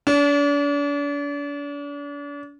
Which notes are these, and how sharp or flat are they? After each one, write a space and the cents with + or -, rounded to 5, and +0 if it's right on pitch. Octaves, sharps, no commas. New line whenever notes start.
D4 -40